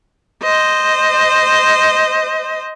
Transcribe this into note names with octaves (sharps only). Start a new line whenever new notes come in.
C5 D#5